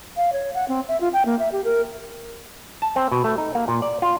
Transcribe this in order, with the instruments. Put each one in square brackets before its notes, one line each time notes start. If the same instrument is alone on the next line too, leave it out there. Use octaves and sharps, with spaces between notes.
[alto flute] F5
C#5
F#5
C4
E5
F4
G5
A#3
E5
G4
A#4
[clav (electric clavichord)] A5
C4
B2
A3
D#4
A#3
A#2
D5
F4